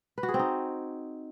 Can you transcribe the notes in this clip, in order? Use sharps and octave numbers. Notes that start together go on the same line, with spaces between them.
B4
F#4
G#4
C4
D#4